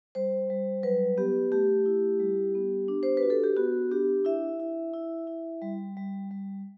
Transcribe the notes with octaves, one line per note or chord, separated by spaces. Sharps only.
G3 C5
G3
F#3 B4
B3 G4
A3 G4
E4
G3
B3
D4
C5
B4
F#4
A4
G4
B3 F#4
D4 G4
E4 E5
E4
E4
E4
G3
G3
G3